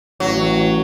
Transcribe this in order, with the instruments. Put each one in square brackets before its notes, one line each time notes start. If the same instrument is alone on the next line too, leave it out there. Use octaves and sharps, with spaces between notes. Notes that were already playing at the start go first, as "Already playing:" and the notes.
[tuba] A1 [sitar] F#3